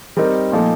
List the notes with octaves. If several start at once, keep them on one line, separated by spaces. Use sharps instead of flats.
G3 C4 D#4 A#4
A#2 F3 A3 D#4